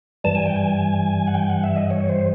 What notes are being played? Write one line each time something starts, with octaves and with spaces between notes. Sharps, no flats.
G2 E3 G3 A5
G#5
G5
G#5
F#5
G5
F#5
E5
D#5
C#5
C5